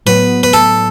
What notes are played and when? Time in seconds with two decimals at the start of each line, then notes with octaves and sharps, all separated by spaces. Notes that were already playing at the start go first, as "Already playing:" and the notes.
0.06 A2 F#3 B3 B4
0.43 B4
0.53 A4